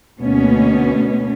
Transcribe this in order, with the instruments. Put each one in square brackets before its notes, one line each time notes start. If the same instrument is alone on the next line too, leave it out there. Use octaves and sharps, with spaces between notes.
[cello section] D2 B2 A#3 B3 C#4